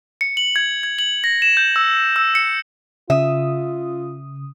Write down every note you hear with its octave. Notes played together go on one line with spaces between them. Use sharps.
C#7
F#7
G#6
G#6
F#7
A#6
E7
G6
E6
E6
C#7
C#3 F4 E5 D#6